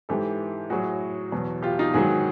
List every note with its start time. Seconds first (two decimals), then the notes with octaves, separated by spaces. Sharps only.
0.09 G#2 E3 G4 A4
0.70 A2 F#3 F#4 G#4
1.32 E2 B2 F#3
1.63 F4 G4
1.79 D#4 F4
1.93 G#2 D#3 F#3 F#4 G#4